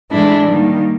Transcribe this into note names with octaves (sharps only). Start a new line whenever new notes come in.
A2 E3 G#3 D4 E4
D#3 G3 A#3